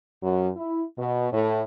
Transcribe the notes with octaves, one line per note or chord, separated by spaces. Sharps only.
F#2
E4
B2
A2